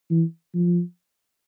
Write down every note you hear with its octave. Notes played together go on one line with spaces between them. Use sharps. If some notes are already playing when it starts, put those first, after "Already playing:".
E3
F3